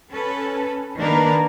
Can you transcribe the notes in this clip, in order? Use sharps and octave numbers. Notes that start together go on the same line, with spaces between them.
C#4 A4 B4
D#3 A#3 D4 A#4 B4